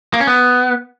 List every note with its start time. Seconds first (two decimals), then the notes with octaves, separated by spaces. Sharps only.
0.13 A#3
0.20 C#4
0.27 B3